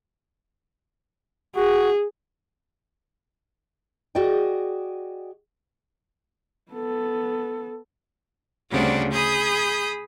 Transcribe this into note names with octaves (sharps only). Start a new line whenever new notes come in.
F#4 G#4
F#4 G#4 D5 D#5 G5
B3 A4
D2 C#3 G3 C4 D4 F#5
G#4 B5 D#6 G6